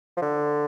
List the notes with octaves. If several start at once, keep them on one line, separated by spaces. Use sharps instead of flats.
F3
D3